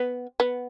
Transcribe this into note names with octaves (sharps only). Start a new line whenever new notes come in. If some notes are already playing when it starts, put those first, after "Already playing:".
Already playing: B3
B3